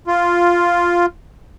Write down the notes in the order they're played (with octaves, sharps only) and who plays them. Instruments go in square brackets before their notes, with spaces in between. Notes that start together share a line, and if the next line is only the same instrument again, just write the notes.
[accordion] F4